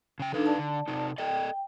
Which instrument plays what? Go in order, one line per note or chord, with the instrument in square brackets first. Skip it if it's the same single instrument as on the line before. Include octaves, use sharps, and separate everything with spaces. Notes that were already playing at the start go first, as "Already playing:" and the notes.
[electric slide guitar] C#3 G5
[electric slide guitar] E2 B4 F5 [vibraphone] D4 D#4 A4
[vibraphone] D5 A5
[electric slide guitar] D3
C3 D#4 A4
[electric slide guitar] A4 D5 D#5 [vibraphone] G5